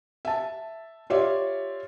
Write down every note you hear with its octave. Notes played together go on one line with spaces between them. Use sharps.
E5 A5
F4 G4 C#5 D5 E5